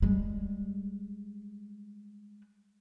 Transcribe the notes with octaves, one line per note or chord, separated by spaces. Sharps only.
G3 G#3